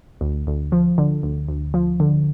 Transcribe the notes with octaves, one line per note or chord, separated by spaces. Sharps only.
D2
D2
F3
D3
D2
D2
F3
D3